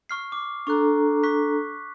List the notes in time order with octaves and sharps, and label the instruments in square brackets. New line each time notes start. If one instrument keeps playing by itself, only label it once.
[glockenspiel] C#6 F6 C7
D6
[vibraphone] D4 A4 A#5 [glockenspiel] C#6 F#6
[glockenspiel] C#6 F#6 B6